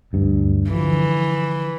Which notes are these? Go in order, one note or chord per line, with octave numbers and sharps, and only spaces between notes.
D2 G2
D3 E3 F3